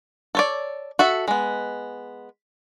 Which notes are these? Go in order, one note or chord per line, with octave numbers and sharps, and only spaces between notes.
A4 C#5 D5
F#4 A4 E5
G#3 B3